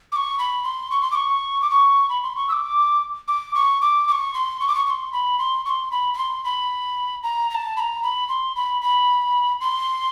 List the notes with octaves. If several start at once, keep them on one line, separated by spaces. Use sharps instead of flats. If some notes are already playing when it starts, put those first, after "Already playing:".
D6
C#6
B5
C6
C#6
C6
D6
C#6
D6
C#6
B5
C6
C#6
E6
D6
D6
C#6
D6
D6
C#6
C6
C#6
D6
C#6
C#6
C6
B5
C6
C#6
C6
B5
B5
C6
B5
A#5
A#5
A5
B5
A#5
B5
C6
B5
B5
C6